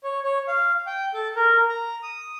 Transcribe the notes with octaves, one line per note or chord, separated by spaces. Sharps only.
C#5
C#5
F5
G5
A4
A#4
A#5
D#6